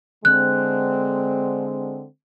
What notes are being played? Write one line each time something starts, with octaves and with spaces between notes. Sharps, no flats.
D3 G#3 C4 F#6